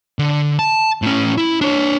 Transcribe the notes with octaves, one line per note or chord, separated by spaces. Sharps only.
D3
A5
A2 C#4
E4
D4 C#5